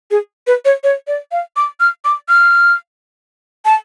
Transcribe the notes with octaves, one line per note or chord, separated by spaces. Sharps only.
G#4
B4
C#5
C#5
D5
F5
D6
F6
D6
F6
A5